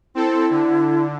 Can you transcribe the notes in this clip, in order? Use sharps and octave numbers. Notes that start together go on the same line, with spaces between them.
C4 E4 A4
D3